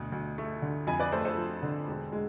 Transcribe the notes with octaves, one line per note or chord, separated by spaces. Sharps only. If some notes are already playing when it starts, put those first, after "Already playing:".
Already playing: D2 B2
D2
A3
D3
F2 G#5 B5
B4 D5
A3 A4 C5
A4 C5
F3
D3
E1
G#3